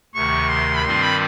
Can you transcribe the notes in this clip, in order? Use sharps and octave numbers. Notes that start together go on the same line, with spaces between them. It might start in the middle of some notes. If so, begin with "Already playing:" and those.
D2 C3 D#3 C#6
C6
B5
G2 D#3 G3 C4 F4 C6
B5